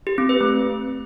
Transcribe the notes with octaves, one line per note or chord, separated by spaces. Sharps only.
G4
C4
B4
A3